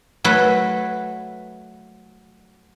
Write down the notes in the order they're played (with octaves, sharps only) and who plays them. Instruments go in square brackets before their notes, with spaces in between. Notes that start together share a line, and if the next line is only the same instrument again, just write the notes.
[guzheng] F#3 A3 A4 B4